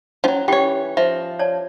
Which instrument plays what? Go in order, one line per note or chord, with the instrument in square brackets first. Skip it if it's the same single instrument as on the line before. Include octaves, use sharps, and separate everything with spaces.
[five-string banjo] F3 F#3 [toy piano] C#4
[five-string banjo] E3 C#5 [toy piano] G4 G5
[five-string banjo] F3 [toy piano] E5
[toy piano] C#5 D5 A5